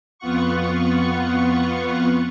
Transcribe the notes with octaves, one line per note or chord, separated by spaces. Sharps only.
F2 B3 F4 F#5 C#6